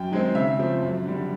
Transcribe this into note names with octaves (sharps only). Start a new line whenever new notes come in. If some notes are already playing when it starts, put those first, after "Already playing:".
Already playing: F#2 G5
D#3 G#3 C4
C#3 E5
F3 A3 C4
F#2
D3 G3